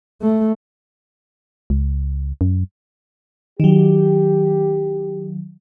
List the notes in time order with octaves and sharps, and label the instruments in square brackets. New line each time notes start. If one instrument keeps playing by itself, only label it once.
[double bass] A3
[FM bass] C#2
F#2
[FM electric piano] D#3 F#3 [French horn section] G4